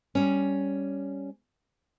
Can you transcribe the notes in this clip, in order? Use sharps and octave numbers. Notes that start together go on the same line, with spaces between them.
G3 C#4